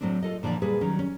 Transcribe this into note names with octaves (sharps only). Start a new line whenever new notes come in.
A2 F#3 A3 C4 D4
F4 A4 D#5
A#2 D3 E3 F3 D5
A#2 G3 G#4 B4
D#3 F#3 C#4
C#4